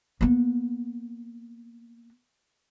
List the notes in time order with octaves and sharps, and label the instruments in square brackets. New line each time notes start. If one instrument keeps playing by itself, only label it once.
[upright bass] A#3 B3